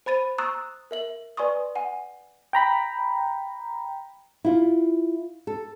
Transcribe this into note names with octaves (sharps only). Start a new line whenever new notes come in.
C5 B5 A6 D#7
A#5 C#6 D#6 E6 F#6 A6
A#4 E5 F#7
B4 D5 G#5 C6 C#6 D#6
F#5 G#5
G5 A#5 B5
E4 F4
A4